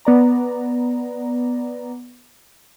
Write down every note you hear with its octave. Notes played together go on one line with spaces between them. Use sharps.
B3 D5 A#5